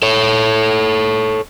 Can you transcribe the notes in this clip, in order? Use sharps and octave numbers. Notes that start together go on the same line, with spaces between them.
A4 C#5